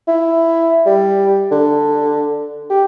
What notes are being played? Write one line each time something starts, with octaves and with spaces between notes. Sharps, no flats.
E4
G3
D3
G4